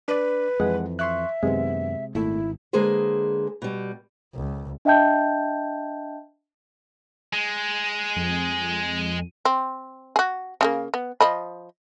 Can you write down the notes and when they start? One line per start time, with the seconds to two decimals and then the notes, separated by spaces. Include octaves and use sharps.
0.08 D4 B4 D5
0.60 F2 E3 G#3 F#5
0.99 E5 C6 C#6 F#6
1.43 F#2 C3 D#3 G#3 B3
2.15 G#1 A#2 A3 E4
2.73 D3 G#3 A#3 G#4 B4 C5
3.62 B2 G3
4.35 C#2
4.85 D4 D#5 E5 G5 A5 G6
7.33 G#3
8.16 F2
9.45 C4
10.16 F#4 G#4
10.61 C#3 A3 A#3
10.94 B3
11.20 F3 D#5 B5